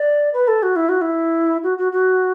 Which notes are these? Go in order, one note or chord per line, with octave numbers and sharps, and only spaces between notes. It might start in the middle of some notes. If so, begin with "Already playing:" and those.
Already playing: D5
B4
A4
F#4
E4
F#4
E4
F#4
F#4
F#4